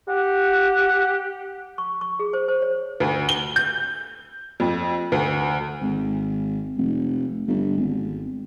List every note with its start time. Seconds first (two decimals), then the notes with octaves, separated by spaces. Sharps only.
0.08 G4 F#5
1.78 C#6
2.01 C#6
2.19 G#4
2.33 C5
2.48 C5
2.62 C#5
3.00 D2
3.29 G7
3.56 G6
4.60 F2
5.12 D2
5.82 G#1
6.78 F1
7.48 G1
7.77 G#1